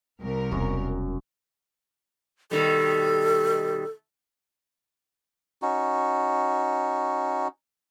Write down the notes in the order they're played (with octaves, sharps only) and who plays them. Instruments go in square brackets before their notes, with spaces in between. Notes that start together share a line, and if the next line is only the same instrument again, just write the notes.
[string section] C2 A#4
[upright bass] E1 G#3 [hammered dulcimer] F#2
[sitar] B2 D#3 G3 [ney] A4
[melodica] C#4 D#4 F#4